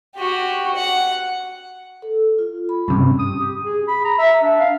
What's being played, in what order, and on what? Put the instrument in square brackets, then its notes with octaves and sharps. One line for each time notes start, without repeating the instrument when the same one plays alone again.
[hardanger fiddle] F#4 G4
F#5
[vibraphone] A4
F4
B5
[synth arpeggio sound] G2 C3 [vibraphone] C#4
[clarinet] D#6
G4
G#4
B5
A#5
E5
D4
F5